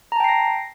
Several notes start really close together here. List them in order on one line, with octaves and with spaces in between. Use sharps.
A#5 A5 G5 C7 A#6